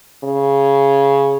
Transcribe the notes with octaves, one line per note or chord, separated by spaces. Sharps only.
C#3